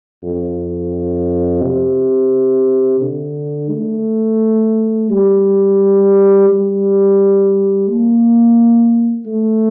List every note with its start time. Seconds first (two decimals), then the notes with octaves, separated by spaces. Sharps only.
0.23 F2
1.62 C3
3.01 D3
3.70 A3
5.10 G3
6.49 G3
7.88 A#3
9.26 A3